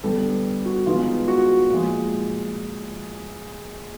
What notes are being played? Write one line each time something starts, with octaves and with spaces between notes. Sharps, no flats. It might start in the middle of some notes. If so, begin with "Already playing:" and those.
D3 G3 B3 A4
F#4
D#3 G#3 B3 F4
F#4
A#2 F3 G#3